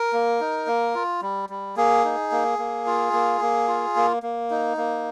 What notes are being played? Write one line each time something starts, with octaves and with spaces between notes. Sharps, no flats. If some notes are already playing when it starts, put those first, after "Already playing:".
Already playing: A#4
A#3
D#4
A#3
F4
G3
G3
A#3 G#4
D#4
A#3
A#3
F4
A#3
A#3
F4
A#3
A#3
D#4
A#3